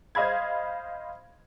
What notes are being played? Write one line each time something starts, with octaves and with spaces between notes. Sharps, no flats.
C5 D#5 F5 B5 G#6